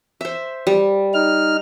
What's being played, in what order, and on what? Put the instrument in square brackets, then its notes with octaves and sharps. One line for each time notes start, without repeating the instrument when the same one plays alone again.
[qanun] C5 E5
G3
[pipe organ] D#4 F6